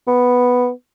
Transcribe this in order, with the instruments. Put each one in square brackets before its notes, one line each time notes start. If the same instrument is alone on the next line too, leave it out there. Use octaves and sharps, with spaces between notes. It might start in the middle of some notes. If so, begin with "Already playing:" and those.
[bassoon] B3